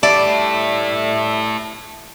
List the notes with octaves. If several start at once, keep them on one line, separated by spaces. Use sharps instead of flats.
G3 E4 A4 D5 E5